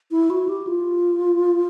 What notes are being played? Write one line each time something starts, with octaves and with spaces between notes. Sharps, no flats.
E4
F#4
G4
F4